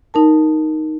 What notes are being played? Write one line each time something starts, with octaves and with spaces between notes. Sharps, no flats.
D#4 A#4 A5